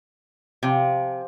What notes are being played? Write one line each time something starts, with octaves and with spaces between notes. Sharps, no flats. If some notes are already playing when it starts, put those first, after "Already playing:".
C3 F3 G#5 D6